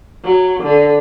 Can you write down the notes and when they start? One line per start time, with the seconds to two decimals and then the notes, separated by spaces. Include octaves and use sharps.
0.24 F#3
0.63 D3